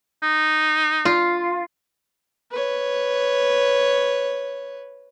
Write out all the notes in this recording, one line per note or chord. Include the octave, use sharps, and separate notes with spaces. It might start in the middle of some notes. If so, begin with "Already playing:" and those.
D#4
F4
B4 C#5